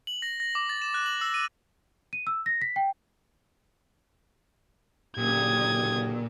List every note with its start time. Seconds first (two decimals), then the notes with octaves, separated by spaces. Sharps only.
0.07 F#7
0.22 A#6
0.40 A#6
0.55 D6
0.69 A6
0.82 E7
0.94 F#6
1.06 F#7
1.21 E6
1.34 D#7
2.13 D#7
2.27 E6
2.46 A#6
2.62 B6
2.76 G5
5.17 F#1 A#2 D3 G4 D#6 G#6